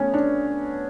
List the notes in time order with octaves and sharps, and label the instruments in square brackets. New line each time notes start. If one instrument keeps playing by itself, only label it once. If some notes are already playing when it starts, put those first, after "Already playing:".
Already playing: [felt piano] A3 B3 C#4
D4